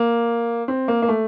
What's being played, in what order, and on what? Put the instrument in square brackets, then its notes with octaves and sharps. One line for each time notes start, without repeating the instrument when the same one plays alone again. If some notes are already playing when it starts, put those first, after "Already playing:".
Already playing: [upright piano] A#3
C4
A#3
A#3
A3